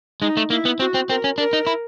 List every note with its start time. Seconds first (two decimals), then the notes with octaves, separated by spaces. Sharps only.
0.21 G#3 D#4
0.37 A3
0.50 A#3 E4
0.65 B3
0.80 C4 F#4
0.94 C4
1.09 C4 A#4
1.24 C#4
1.38 D4 A#4
1.53 D#4
1.67 E4